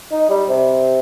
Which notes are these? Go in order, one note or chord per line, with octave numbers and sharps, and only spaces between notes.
D#4
G3
C3